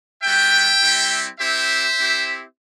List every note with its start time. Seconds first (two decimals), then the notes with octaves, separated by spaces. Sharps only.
0.23 G3 B3 F#4 E5 G5
0.82 G3 C4 E4 G4
1.39 C4 E4 G4 C5 E5
1.97 C4 E4 G4